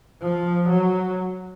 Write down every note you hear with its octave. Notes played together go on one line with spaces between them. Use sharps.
F3
F#3